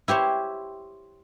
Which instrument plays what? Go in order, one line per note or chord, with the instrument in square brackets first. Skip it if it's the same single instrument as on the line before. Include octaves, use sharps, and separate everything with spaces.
[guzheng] E4 G4 C5 C#5